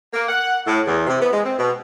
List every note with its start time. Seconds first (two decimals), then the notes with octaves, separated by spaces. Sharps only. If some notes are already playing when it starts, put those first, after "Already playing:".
0.14 A#3
0.29 F#5
0.67 A2
0.86 E2
1.07 C3
1.21 B3
1.33 G#3
1.45 C4
1.58 B2